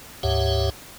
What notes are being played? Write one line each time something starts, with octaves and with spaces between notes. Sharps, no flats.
D2 G#2 G4 C#5 E5 F#5